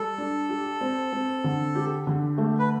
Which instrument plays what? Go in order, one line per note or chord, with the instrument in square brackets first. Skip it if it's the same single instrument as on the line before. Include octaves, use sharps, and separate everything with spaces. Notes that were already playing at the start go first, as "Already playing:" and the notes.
Already playing: [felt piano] G3 [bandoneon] A4
[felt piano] D4
G4
C4
C4
D3
G4
D3
A3
[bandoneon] B4